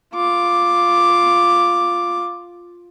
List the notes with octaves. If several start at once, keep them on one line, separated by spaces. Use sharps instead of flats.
F4 D6